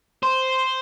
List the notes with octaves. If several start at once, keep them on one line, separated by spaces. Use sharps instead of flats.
C5